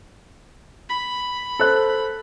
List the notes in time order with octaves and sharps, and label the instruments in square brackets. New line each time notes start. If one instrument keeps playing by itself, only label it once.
[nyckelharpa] B5
[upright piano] A4 C5 F#6